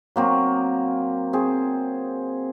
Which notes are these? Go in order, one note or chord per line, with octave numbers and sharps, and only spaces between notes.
F#3 A#3 C4
C4 G#4